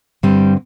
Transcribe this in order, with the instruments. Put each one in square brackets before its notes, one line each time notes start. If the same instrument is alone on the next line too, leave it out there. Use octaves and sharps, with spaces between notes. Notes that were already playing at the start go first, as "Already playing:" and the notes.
[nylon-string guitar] G2 D3 G3 C4